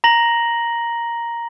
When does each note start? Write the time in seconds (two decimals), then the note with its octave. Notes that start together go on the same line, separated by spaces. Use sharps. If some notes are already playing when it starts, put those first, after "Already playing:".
0.04 A#5 A#6 F#7